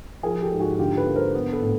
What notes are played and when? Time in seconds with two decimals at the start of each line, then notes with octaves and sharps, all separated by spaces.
0.23 F3 G#4 A#4
0.41 G4 A4
0.52 G#2
0.60 F#4 G#4
0.79 D3 F4 G4
0.97 A4 B4
1.06 A#3
1.16 A#4 C5
1.35 B3
1.52 A4 B4
1.62 A2